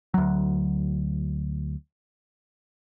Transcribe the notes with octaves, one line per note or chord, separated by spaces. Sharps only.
D2 F#3